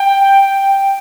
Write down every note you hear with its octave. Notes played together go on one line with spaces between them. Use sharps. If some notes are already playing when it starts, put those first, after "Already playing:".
Already playing: G5